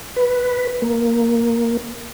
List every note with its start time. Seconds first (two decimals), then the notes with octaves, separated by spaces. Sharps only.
0.16 B4
0.82 A#3